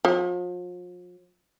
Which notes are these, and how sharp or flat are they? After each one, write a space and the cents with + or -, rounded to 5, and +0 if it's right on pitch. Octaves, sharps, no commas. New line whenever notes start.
F3 +40